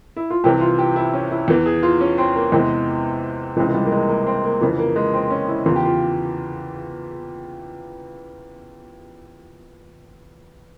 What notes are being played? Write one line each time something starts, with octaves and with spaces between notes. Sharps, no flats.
E4
F4
C2 C3 E3 G4
F4
G4
E4
C#4
E4
E2 E3
G#4
F4
C#4
C4
A#3
E2 C3 E3 G#3
C#2 C3 E3 G#3
G#3
G3
A#3
G#3
A#3
C4
A#3
F2 C#3 E3
A#3
G#3
C4
C#4
E4
E2 C#3 E3 F4
G4
F4